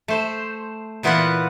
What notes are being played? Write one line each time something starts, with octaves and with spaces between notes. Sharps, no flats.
A3 C5
A#2 E3 B3 F4 B4 F#5